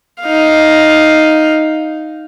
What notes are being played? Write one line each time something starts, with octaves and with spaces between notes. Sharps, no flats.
D#4 F5